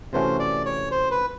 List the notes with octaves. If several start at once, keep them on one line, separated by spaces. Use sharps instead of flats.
C3 E3 A3 C#4 F#4 C5
D5
C#5
C5
B4